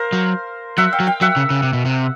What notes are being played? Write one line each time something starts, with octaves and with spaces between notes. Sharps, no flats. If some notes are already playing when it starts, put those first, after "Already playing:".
Already playing: A#4 C5 F5
F#3
F#3 E5 F#5
F5 G5
F#3
F5 G5
F#3 E5 F#5
C#3
C#3
C3
B2
C3